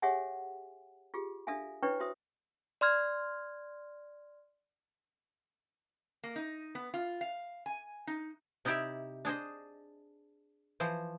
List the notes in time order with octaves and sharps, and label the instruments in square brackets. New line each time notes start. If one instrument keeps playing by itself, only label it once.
[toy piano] G4 G#4 C#5 E5 F#5 G#5
F4 G4 G#4
D4 A4 E5 F5 G#5
D4 E4 B4 C#5 G5 C#6
F#4 C5 E5 D#6
[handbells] D5 C6 F6 G#6
[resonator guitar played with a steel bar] A#3
D#4
B3
F4
F5
G#5
D#4
[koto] C3 D#4 E4 G4 D5 E5
D4 G#4 C5 D#5
E3 F3 C5